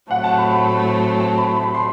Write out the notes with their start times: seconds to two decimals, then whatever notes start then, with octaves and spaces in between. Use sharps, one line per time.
0.11 A2 F#3 A3 C4 F#5
0.24 A5
0.38 B5
0.51 B5
1.20 A5
1.38 B5
1.56 B5
1.74 C6